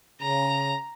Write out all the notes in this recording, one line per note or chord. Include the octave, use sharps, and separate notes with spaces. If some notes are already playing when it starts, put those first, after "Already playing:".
C#3 A#5